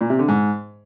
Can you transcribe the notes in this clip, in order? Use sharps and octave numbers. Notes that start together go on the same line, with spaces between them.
A#2
C3
D3
G#2